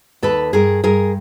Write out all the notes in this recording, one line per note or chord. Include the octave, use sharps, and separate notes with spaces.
D#2 A4 B4
G2 G#4 A#4
G2 G#4 A#4